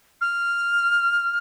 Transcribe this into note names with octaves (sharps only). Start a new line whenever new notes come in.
F6